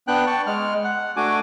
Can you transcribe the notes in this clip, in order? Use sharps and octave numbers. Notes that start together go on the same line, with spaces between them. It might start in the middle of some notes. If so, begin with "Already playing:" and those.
B3 D4 G5 F#6
G5 A5 C#6
G#3 F6
F#5
A3 D4 F#4 G#5 D6